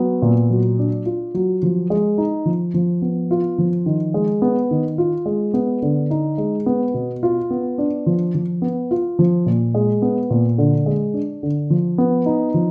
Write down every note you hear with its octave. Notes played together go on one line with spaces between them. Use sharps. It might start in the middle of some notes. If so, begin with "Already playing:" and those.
Already playing: F#3 B3
A#2
F#3
D4
F4
F#3
F3
G#3
D#4
F3
F3
B3
F4
F3
D#3
G#3
B3
D#3
F4
G#3
B3
D3
D#4
G#3
B3
B2
F4
B3
D4
F3
F3
B3
F4
F3
A#2
G#3
B3
A#2
D3
G#3
D4
D3
F3
B3
D#4
F3